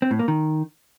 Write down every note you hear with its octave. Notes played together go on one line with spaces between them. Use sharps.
C4
A2
A#3
D#3